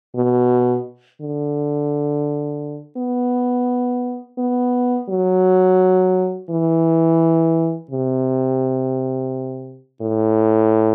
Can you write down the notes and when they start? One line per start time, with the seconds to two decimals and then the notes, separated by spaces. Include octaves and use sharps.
0.16 B2
1.21 D3
2.97 B3
4.38 B3
5.09 F#3
6.50 E3
7.91 C3
10.02 A2